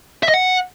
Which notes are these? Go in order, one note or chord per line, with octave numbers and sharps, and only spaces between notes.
E5
D#5
F#5